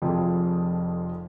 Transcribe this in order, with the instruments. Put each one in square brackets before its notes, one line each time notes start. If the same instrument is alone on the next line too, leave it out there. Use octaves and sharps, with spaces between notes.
[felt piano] F1 F2 F4 G#4 G5